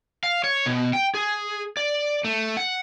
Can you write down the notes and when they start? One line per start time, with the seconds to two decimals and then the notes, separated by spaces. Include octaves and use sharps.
0.23 F5
0.44 C#5
0.66 B2
0.93 G5
1.14 G#4
1.77 D5
2.24 A3
2.57 F#5